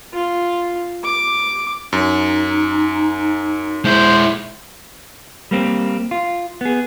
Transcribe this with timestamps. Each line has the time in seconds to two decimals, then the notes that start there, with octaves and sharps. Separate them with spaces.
0.14 F4
1.03 D6
1.93 F#2 D#4
3.85 G#3 E4 C5
5.51 G3 A#3 C4
6.11 F4
6.61 B3 G#4